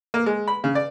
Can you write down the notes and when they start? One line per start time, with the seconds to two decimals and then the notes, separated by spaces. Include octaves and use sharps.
0.14 A#3
0.26 G#3
0.48 B5
0.64 C#3
0.75 D5